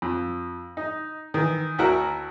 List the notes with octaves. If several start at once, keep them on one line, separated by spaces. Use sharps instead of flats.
F2
D#4
D#3 E3
D2 E4 F#4 A#4 F#5